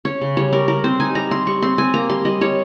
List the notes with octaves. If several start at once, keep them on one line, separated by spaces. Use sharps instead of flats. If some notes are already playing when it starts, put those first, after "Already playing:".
C#4 C#5
C#3
G3 C#5
G3 A#4
G3 A#4
C4 C5
D#4 G#5
G3 A#5
C4 C6
G3 C#6
C4 C6
C4 G#5
A#3 A#5
G3 C6
G3 D#5
G3 C#5